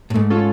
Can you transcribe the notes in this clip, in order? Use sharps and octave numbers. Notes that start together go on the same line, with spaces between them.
A2
G#2 A3
C#4 F4 A4